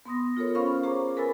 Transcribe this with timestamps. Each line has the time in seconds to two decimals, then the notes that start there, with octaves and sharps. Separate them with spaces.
0.05 B3 C6 D#6 A#6
0.37 F4 A4 A#4 C#5
0.55 C#4 C5 F5 B5 C#6 F6
0.83 G#4 C5 A#5 C#6 D6
1.17 A#4 B4 G#5 B5 E6 A6